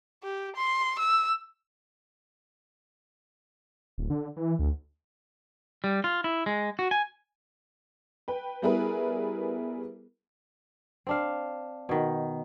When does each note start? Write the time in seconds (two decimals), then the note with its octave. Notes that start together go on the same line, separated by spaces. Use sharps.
0.23 G4
0.56 C6
0.99 E6
3.98 D1
4.10 D3
4.37 E3
4.59 D2
5.84 G3
6.04 F4
6.24 E4
6.46 G#3
6.79 F#4
6.91 G#5
8.28 B4 G5
8.62 G3 B3 E4 G#4 A#4 B4
11.07 C4 D4 F5
11.89 B2 D#3